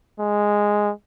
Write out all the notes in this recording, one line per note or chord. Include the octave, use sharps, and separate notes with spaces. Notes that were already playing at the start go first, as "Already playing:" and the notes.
G#3